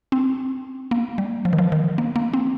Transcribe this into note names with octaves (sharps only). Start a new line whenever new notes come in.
C4
A#3
G3
F3
D#3
F3
D#3
A#3
A#3
C4